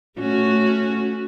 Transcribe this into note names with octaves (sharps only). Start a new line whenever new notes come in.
A3 C#4 F#4